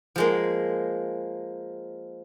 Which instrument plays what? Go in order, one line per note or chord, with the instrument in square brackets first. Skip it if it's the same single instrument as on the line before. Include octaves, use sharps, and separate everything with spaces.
[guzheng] F3 G#3 A#3